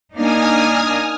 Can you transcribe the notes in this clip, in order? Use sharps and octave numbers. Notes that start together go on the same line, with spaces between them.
A#3 D4 D#4 G#5 D#6 F6